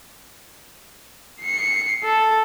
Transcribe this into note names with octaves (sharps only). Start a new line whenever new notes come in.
C7 C#7
A4